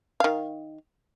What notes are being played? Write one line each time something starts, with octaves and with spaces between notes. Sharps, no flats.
D#3 F5